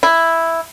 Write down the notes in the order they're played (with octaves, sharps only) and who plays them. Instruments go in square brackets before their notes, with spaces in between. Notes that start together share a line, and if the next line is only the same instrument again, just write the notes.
[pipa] E4